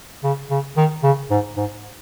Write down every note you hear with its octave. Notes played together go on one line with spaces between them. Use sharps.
C#3
C#3
D#3
C#3
G#2
G#2